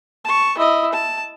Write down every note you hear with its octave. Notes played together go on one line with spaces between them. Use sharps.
A5 C#6
E4 D#5
A5